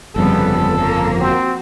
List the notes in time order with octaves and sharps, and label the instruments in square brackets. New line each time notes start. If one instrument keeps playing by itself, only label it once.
[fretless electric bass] G1 F2 C#3 [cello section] F3 G3 B3 [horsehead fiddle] A4
[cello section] F3 A#3
[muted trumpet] C4 [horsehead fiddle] F#4